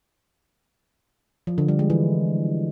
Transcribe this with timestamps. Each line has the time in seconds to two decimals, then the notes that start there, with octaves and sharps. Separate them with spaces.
1.47 F3
1.58 D3
1.68 G3
1.79 G#3
1.90 E3